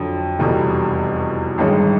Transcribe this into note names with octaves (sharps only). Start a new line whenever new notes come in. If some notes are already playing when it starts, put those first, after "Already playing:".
Already playing: F2 D3 F#3
F1 E2 B2 G3
A1 G2 D#3 G#3